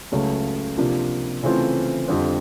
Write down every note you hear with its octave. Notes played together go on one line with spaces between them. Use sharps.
C#2 C#3 F#3 A3
C3 F3 A#3 D4 F4
C#3 E3 A3 C4 F4
F2 D3 G3 C4 F4